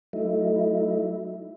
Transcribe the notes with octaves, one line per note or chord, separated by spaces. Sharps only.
F#3 A3 D#4 E4